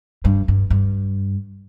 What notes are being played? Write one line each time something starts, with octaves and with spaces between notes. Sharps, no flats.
G2
G2
G2